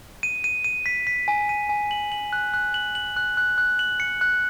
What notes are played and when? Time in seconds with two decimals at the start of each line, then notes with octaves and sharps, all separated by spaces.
0.23 D#7
0.44 D#7
0.64 D#7
0.86 B6
1.07 B6
1.28 G#5
1.49 D#7
1.69 G#5
1.91 F#7
2.12 F#7
2.33 F#6
2.54 F#6
2.74 F#7
2.95 F#7
3.16 F#6
3.37 F#6
3.58 F#6
3.79 F#7
4.00 C#7
4.21 F#6